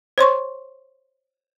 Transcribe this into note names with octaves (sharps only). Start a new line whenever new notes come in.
C5 C#5 C6 C#6